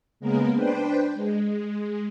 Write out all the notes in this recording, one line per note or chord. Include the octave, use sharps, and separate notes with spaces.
C#3 G#3 A#3 B3 A#4
D4 B4 C5 G5
G#3